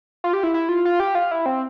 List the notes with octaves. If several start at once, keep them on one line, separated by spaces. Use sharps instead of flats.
F4
G4
E4
E4
F4
F4
G4
F4
E4
C4